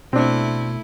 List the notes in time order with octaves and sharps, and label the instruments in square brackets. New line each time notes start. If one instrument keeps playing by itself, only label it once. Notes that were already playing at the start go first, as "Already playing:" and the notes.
[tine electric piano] B2 [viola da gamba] A3 E4 [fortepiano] C4 D4